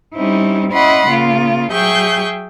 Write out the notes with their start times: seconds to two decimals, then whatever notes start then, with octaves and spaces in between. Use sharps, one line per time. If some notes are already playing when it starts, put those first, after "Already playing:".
0.14 G3 C4 C#4 D#4 E4
0.71 C#4 E4 D#5 F#5 B5 C6
1.07 C#3 A#3 F4
1.71 F#3 G#4 E5 G5 C#6 G6